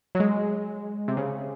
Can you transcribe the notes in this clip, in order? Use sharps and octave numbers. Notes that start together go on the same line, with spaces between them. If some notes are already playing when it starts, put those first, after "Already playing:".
F#3
G#3
C3
C#3